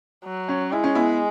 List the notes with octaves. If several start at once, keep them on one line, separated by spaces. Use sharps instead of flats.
F#3
C#4
G#3 E4
C#4
B3 E4